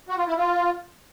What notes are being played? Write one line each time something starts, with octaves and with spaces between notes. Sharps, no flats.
F#4
F4
E4
F4